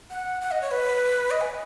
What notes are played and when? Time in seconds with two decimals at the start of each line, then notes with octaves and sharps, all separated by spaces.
0.11 F#5
0.41 F#5
0.51 D#5
0.61 C#5
0.71 B4
1.31 D#5
1.41 G#5